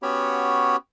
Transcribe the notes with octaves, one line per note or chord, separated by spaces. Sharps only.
B3 C#4 F#4 G4 C#5 B5